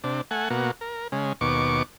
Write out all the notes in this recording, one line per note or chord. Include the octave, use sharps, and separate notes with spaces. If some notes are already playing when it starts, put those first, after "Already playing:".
C3 D4
A3 F#5 G#5
B2 A#3 F#4
A#4
C#3 G#3
D#2 B2 C#6 D6